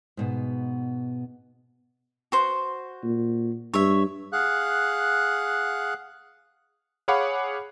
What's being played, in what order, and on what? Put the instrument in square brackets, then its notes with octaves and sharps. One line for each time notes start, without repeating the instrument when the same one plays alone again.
[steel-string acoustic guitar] G#2 B2 B3
[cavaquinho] F#4 C5
[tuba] A#2
[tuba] G2 [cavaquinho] C#5 E5
[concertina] G#4 F5 F#5 F#6
[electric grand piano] G#4 C#5 F5 F#5 B5 D6